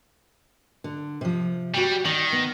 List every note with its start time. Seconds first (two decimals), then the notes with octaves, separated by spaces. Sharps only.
0.84 D3
1.21 C3 F3
1.74 G3 F#4 G5
2.05 D#3 D5
2.33 B3